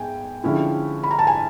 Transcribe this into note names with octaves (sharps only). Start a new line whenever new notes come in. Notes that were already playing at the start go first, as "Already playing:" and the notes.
Already playing: G#2 B3 G5 G#5
D3 F3 G#3 C#4 E4
B5
A#5
A5
G#5